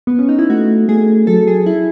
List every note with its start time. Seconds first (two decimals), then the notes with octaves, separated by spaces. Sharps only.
0.07 B3
0.19 C#4
0.29 D#4
0.39 E4
0.50 A3 F#4
0.89 A3 G#4
1.27 F#3 A4
1.47 G#4
1.66 E4